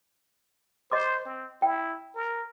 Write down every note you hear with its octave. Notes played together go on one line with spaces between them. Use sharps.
C5 D#5 C6 D6
C4
E4 G5
A#4